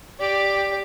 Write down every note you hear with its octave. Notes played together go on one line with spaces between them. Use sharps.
G4 D5